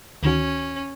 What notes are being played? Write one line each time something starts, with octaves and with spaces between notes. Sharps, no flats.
D2 D#3 C#4 F#4